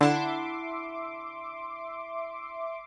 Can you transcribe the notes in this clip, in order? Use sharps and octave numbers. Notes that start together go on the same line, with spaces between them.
D3 D4 E4 E5 F#5 C6 D6